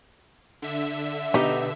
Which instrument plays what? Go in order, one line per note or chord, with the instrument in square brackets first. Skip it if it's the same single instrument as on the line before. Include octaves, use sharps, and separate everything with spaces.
[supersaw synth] D3 E5
[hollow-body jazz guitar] B2 B3 G4 [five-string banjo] D#4